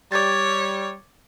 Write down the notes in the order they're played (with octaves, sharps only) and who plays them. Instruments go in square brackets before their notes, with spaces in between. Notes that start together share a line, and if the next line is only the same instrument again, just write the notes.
[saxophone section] G3 [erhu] C#5 [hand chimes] D6 G#6 A6